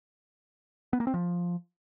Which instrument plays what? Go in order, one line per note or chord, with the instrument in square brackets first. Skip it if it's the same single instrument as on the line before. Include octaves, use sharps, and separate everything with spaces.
[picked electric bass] B3
A#3
C4
F3